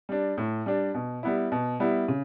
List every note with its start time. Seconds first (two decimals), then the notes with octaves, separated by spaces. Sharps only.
0.09 G3 D4
0.38 A2
0.66 G3 D4
0.94 B2
1.23 G3 B3 E4
1.52 B2
1.80 G3 B3 E4
2.08 C#3